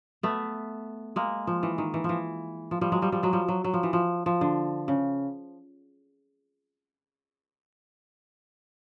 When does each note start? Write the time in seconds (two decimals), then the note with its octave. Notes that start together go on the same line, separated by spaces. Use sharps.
0.23 A3 B3
1.16 G#3 A#3
1.47 F3
1.63 E3
1.78 D#3
1.94 E3
2.04 E3 F3
2.71 F3
2.81 F3 G3
2.92 F#3 G#3
3.02 F3 G3
3.12 F3 G3
3.23 F#3 G#3
3.33 F3 G3
3.48 F#3
3.64 F#3
3.74 F3
3.83 E3
3.93 F3
4.26 F3
4.41 D3
4.88 C#3